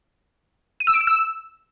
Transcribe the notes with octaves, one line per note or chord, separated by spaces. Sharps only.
D#7
E6
D7
E7
E6